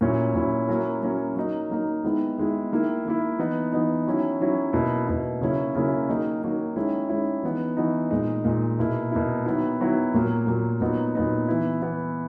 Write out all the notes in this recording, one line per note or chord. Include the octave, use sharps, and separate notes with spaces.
A#2 F#3 C#4 E4
A#2 F#3 C#4 E4
F#3 A#3 C#4 E4
F#3 A#3 C#4 E4
F#3 A#3 D#4
F#3 A#3 D#4
D#3 G#3 B3 E4
D#3 G#3 B3 E4
D#3 A#3 E4
D#3 A#3 E4
E3 B3 D#4
E3 B3 D#4
D#3 F#3 C#4 E4
D#3 F#3 C#4 E4
B2 A#3 E4
B2 A#3 E4
C#3 F#3 A#3 C#4 E4
C#3 F#3 A#3 C#4 E4
D#3 F#3 A#3 D#4
D#3 F#3 A#3 D#4
D#3 G#3 C#4 E4
D#3 G#3 C#4 E4
E3 B3 D#4
E3 B3 D#4
A#2 G#3 D#4
A#2 G#3 D#4
B2 A#3 E4
B2 A#3 E4
D#3 F#3 B3 E4
D#3 F#3 B3 E4
A#2 F#3 A#3
A#2 F#3 A#3
A#2 F#3 B3 D#4
A#2 F#3 B3 D#4
E3 B3 E4
E3 B3 E4